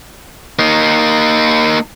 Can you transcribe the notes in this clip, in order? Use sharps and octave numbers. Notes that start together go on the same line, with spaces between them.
A#3 D#4